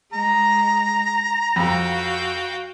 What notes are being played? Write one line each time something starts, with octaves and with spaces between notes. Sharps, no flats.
G#3 A#5
F2 F#4 F5 G5